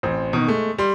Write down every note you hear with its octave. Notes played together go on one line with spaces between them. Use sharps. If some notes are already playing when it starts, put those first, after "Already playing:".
A1 C4
B2 D#3
G#3 A3
G3 C6